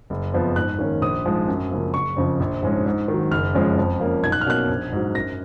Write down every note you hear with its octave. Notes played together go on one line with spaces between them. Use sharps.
F#1
F2 F3 B3
G#2 F#6
D#3 A#3 C#4
A#1 D#6
G#2 F3 G#3
F#2
C#3 F3 A#3
F#1 C#6
F2 C#3 F3
A#1
G#2 F3 G#3 C#4
G#2
D#3 F#3
F#1 F6
F2 F3 G#3 C#4
F2
F3 A#3 C#4
B1 G#6
F#6
F6
B2 A#3 C#4 F#6
A#1
G#2 F#3
F#2 A#6